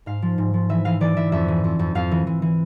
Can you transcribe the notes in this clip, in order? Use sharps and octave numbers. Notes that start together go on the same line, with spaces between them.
G#2 F5
F3
G#2
F3
E3 E5
E3 F5
E3 D5
E3 E5
F2 E5
E3
F2
F2
F2 F5
E3
E3
E3